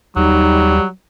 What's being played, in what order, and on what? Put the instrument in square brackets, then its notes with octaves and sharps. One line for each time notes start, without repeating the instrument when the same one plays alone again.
[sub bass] D#2 [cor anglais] F#3 [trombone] G3 [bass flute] D#4